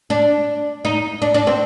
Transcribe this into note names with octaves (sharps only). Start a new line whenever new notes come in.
D4
D#4
D4
D4
C4